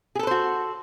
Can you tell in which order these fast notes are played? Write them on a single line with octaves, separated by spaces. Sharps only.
G#4 A4 B4 C5 F#4